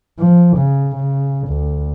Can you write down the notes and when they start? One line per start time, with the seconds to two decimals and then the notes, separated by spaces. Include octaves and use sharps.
0.19 F3
0.57 C#3
0.96 C#3
1.49 D2